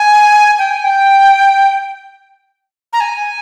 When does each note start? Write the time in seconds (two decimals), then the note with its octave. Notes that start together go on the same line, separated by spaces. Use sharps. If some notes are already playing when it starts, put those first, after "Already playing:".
Already playing: G#5
0.58 G5
0.71 G#5
0.84 G5
2.93 A#5
3.00 G#5